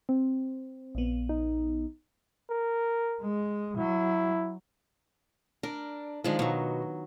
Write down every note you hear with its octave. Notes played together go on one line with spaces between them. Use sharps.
C4
A#1 B3
D#4
A#4
G#3
F#3 E4
D4 A#4
D#3 F3 G#3 D4
B2 F#3 C#6